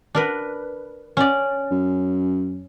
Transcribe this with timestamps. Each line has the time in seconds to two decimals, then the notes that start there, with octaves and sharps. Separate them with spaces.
0.15 D4 A#4 B4
1.17 C#4 D5
1.71 F#2